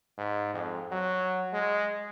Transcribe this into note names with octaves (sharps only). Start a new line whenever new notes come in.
G#2
F2
F#3
G#3